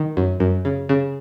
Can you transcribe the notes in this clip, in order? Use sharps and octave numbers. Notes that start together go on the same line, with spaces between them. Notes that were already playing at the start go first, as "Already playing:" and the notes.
Already playing: D#3
F#2
F#2
C#3
C#3